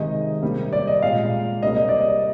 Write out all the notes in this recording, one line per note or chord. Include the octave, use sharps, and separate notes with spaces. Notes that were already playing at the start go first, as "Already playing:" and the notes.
Already playing: C3 D#3 G#3 D#5
C3 G3 A#3
D5
D#5
A#2 G#3 F5
C3 G3 A#3 D#5
D#5
D5
D#5